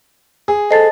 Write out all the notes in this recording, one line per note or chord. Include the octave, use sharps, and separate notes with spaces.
G#4
A4 C5 D#5 A5 A6 C7